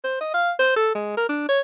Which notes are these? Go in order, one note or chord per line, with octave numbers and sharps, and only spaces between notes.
C5
D#5
F5
C5
A4
G#3
A#4
D4
C#5